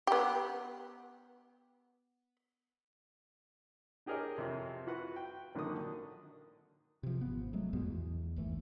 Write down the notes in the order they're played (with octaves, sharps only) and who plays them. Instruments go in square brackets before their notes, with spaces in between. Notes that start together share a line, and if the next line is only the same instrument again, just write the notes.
[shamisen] B3 G4
[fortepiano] D4 G4 G#4 A#4 C#5 D#5
F2 C3
F4 F#4 B4 F#5
G5
A#1 D3 D#3 F#3 D#6
[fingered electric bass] C3 F3
G#1 B3
F#3 G#3 A3
B1 F2 G#2 B2
E2
G1 D#2 E3 A3